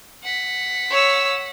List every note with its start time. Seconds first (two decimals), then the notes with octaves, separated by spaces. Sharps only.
0.23 F#5 B6
0.90 C#5 E6